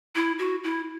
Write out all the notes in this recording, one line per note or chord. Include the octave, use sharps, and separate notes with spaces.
E4
F#4
E4